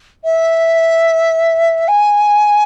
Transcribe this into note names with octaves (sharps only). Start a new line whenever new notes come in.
E5
G#5